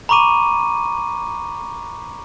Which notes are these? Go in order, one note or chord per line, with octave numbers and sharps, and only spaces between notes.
A#5 B5 C#6 D6 D#7